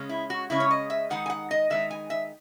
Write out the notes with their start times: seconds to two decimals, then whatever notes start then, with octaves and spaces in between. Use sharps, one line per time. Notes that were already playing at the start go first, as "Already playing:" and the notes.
Already playing: C#3 G#3 C#4
0.09 E4
0.30 F#4
0.50 C#3 G#3 C#4 E4
0.60 C#5
0.71 D#5
0.90 E5
1.10 D#3 G#3 D#4 F#5
1.26 G#5
1.30 F#5
1.51 D#5
1.70 D#3 G#3 D#4 E5
1.91 G#5
2.10 E5